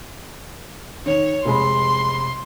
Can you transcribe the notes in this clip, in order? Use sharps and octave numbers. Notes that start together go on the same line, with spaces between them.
D#3 C#5 F7
F1 G#3 B5 C6